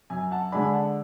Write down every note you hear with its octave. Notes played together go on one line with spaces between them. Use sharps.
F#2 G#5
F#5 A5
D3 G#3 D4 G#5 B5
F#5 A5